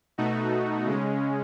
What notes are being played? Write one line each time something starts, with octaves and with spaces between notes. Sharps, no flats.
B2 A3 D#4 F#4
C#3 G#3 C#4